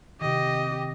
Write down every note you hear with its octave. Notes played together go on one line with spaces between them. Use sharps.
C3 D#3 G4 D#5